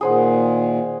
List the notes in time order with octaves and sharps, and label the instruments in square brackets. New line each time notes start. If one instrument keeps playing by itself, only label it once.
[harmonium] A#2 D#3 [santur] G#4 C5 F#5